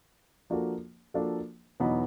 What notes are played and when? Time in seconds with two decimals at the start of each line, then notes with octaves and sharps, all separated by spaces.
0.50 F3 A#3 D4 F#4 A4
1.14 F3 A#3 D4 F#4 A4
1.80 E2 B2 F#3 B3 D#4